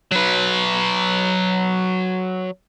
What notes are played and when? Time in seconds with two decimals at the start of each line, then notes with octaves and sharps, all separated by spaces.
0.12 F#3 B4